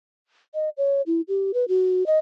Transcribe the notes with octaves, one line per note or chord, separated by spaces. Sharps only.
D#5
C#5
E4
G4
B4
F#4
D#5